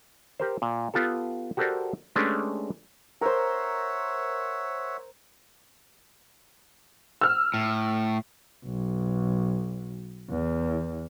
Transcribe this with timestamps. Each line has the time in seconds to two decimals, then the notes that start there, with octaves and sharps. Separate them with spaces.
0.40 G4 A#4 C5
0.62 A#2
0.94 B3 F4 G4 A4
1.57 F#4 G4 A4 A#4 C5 D5
2.15 G#3 A3 C#4 D4 G4 B4
3.21 A#4 C5 C#5 E5 F#5
7.21 E6 F6
7.54 A2
8.65 B1
10.30 E2